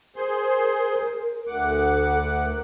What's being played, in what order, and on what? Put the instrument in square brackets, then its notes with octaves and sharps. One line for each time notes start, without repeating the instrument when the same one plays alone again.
[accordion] G#4 C5 C6 [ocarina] A#4
[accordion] D2 F#5 D6
[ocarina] A4
A#4